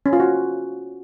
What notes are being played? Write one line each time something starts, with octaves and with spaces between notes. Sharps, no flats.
C#4
F4
F#4